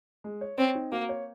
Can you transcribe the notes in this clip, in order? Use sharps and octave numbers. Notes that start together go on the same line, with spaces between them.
G#3
C#5
C4 C#5
D#4
A#3 F#4
C#5